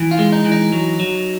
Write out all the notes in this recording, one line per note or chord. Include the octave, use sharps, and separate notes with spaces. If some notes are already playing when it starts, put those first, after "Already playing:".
Already playing: E3
F4
G#3
D#4
E3
D#4
F#3
F#3